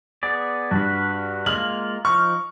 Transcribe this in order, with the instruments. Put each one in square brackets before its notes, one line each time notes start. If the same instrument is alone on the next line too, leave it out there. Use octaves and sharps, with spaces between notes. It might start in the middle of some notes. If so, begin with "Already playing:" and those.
[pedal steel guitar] B3 G#4 D5
[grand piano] G2 [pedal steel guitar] F#4 B4
[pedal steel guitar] G#3 A#3 F4 [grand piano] F6 F#7
[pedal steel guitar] F3 D#4 F6 [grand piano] C#6